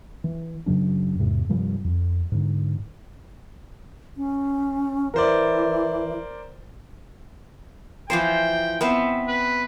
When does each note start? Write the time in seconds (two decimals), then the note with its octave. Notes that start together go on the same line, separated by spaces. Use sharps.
0.24 E3
0.66 F#2 C#3 F#3 D4
1.19 E1 G#2 C3
1.49 G2 C3 F3 G3
1.84 F2
2.32 G#2 D3
4.17 C#4
5.14 E3 A#4 C5 D5
8.10 E3 F3 C5 G5
8.81 B3 C4 E5
9.28 B4